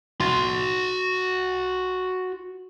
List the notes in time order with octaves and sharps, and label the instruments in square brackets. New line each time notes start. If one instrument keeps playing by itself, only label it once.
[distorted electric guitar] F#4 C6